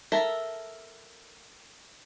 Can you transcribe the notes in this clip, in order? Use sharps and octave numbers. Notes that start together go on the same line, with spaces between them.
A4 A#4 E5